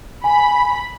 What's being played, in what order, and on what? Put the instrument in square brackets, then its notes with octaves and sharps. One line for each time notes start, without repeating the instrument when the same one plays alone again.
[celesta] G#5 [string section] B5